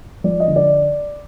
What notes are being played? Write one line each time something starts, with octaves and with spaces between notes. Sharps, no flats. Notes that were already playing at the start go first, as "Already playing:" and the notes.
F3 D5
D#5
D3
D5